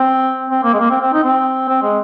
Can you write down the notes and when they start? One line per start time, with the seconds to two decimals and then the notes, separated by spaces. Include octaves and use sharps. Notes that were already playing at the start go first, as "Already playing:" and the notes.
Already playing: C4
0.50 C4
0.64 A#3
0.74 G#3
0.80 A#3
0.91 C4
1.01 C4
1.13 D#4
1.23 C4
1.69 C4
1.83 G#3